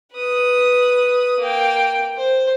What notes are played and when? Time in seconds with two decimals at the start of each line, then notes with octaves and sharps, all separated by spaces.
0.12 B4 D#6
1.39 A#3 G5
2.17 C5